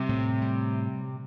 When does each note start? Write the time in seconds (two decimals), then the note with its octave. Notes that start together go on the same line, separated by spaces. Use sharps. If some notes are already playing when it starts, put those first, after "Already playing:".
Already playing: C3 G3
0.09 A2
0.42 G3